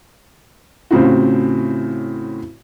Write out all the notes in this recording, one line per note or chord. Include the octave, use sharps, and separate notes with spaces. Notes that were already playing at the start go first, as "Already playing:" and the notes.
A2 C#3 C4 F4 F#4